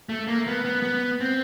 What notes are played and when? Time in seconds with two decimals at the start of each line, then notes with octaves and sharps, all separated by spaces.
0.09 A3
0.27 A#3
0.47 B3
0.65 B3
0.83 B3
1.21 C4